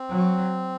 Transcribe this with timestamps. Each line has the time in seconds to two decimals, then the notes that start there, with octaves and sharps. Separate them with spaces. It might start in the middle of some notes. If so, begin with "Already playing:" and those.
Already playing: C4
0.11 F#3